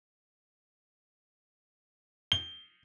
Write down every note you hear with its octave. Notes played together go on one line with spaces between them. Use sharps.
G7